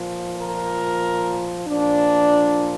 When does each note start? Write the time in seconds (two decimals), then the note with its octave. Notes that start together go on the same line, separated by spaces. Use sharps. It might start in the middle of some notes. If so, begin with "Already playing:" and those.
Already playing: A#2 F3
0.37 A#4
1.68 A#2 F3 D4